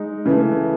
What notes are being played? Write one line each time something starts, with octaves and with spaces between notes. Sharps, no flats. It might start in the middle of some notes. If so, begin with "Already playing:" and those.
Already playing: G#3 D#4
C#3 E3 A3